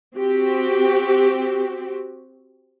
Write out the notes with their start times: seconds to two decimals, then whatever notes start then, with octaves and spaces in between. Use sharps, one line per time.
0.14 C4 F#4 G4